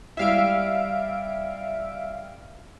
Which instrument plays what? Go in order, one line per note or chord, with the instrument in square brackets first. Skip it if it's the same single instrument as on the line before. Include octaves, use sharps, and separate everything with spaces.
[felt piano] G3 E4 [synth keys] E5 F5 D7